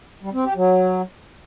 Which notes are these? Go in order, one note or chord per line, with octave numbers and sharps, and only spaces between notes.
G3
C4
G4
F#3